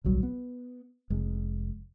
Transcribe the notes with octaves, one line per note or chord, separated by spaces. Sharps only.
D1 B1 F#3 G3
B3
F1 G#3